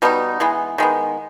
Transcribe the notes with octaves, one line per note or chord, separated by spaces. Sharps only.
B2 G3 B3 D#4
E3 G#3 B3
D#3 G#3 B3